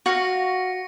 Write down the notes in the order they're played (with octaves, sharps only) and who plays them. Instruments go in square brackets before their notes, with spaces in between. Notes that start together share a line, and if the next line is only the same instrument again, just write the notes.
[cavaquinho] F#4 F5 [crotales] C#6 A#6 C#7